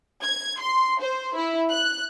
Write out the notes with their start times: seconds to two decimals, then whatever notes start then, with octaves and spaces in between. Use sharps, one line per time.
0.22 G#6
0.61 C6
1.01 C5
1.35 E4
1.71 F#6